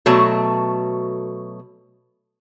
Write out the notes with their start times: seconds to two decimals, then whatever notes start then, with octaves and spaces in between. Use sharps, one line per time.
0.06 B2 F#3 A3 A5